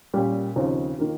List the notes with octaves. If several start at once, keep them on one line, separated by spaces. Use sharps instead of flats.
A#2 G3 C#4 G4
D#2 C#3 F3 C4 D#4
D#3 A#3 F4